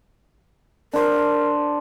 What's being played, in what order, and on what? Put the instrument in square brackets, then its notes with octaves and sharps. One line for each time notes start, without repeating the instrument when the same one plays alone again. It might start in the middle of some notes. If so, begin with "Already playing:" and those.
[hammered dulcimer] D4 C5 [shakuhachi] A#4